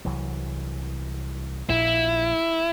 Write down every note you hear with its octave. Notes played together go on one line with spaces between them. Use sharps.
C2 E3 F#3
A#1 A#2 E4